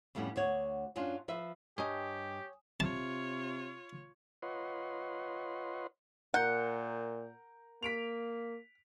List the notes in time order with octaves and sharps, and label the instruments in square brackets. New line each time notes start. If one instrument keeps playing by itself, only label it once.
[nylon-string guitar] F2 A2 G3 B3 C#4
D2 F#4 C#5
F#2 F#3 C#4 D4 F4
F3 B4 E5
[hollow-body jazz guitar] G2 D#5 [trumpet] G4 [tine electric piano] C#5 [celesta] G#5 D#6
[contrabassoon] C3 [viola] F4 C#5 [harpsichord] A5
[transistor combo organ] F4 B4 C#5 D#5 F#5 C6
[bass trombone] A#2 [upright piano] A#4 A#5 G6 [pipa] F#5
[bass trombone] A#3 [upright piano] B6 D7 F7